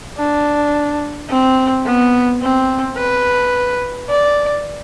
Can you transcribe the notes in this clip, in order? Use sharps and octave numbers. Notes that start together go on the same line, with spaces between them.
D4
C4
B3
C4
B4
D5